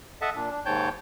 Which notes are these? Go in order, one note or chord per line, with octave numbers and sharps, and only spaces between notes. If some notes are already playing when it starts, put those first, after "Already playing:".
A4 D#5 E5 F#5 A5
A#2 D4
D4
D#2 G#2 C#5 G5 A5 G6